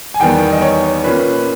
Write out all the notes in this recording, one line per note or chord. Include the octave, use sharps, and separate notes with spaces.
G#5
E2 D#3 G3 B3 G5
D#5
C#5
A#2 A#3 C#4 B4